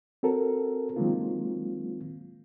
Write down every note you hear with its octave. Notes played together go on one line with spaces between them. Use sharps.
C4 F#4 A4 A#4
D#3 F#3 G#3 A#3 C4 F4